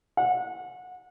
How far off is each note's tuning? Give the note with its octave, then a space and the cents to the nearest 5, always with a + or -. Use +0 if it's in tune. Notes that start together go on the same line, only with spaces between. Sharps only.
F#5 -25